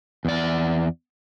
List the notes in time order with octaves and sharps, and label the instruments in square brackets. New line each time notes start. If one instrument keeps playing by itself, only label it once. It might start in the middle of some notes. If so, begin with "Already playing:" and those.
[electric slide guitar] E2 D5